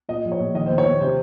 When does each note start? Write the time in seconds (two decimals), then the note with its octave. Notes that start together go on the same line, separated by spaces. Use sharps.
0.09 A#2 D#5
0.25 A#1
0.32 C#5
0.40 A#1
0.54 D#3 D#5
0.66 D#2 C5
0.78 C#5
0.85 D#2
1.01 C3 C5